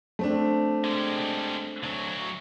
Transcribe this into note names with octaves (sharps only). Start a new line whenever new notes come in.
A3 C4 D4
G3 G#3
D2 F#3